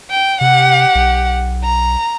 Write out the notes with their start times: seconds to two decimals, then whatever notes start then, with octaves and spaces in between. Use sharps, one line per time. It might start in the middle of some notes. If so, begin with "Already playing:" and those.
0.10 G5
0.41 C3 G4 F#5
0.95 B1
1.63 A#5